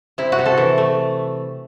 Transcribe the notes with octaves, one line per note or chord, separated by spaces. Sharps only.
C3 E4
F#4
C3
A4
E3
A3